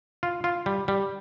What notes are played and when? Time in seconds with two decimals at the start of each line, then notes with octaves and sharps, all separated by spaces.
0.23 F4
0.44 F4
0.66 G3
0.88 G3